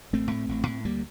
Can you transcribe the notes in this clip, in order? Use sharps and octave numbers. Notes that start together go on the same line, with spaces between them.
A1 A3 C4
A2
A1
A2
D2 G3 A#3